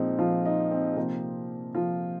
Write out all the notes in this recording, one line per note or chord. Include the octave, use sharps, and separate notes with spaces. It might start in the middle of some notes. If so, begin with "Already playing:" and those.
Already playing: A#2 F3 G#3 C4 D#4
F3 F4
D#4
C4
C3 F3 A#3 C4
F3 F4